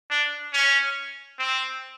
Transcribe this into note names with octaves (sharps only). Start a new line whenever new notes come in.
D4
C#4
C4